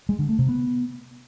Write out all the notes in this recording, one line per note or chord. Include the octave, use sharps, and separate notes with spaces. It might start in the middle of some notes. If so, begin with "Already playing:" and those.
G#3
D3
A3
C3
B3